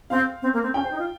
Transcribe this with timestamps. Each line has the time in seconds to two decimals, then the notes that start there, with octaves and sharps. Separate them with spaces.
0.10 C4 F5
0.42 C4
0.54 A#3
0.63 C4
0.74 C#4 G5
0.83 C5
0.91 D#4
0.99 F4